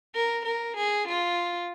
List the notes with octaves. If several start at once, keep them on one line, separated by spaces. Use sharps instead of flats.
A#4
A#4
G#4
F4